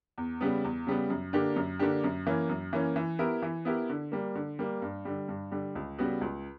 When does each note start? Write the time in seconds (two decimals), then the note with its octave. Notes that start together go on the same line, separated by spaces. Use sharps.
0.18 E2
0.41 C#3 G3 B3
0.64 E2
0.87 C#3 G3 B3
1.10 F#2
1.33 D3 A#3 D4 G4
1.56 F#2
1.79 D3 A#3 D4 G4
2.04 F#2
2.27 E3 A#3 C#4
2.49 F#2
2.73 E3 A#3 C#4
2.96 E3
3.19 B3 E4 G4 A#4
3.42 E3
3.65 B3 E4 G4 A#4
3.90 D3
4.12 G3 A#3
4.35 D3
4.59 G3 A#3
4.82 G2
5.05 D3 G3
5.28 G2
5.52 D3 G3
5.75 C#2
5.99 C#3 G3 B3 F#4
6.21 C#2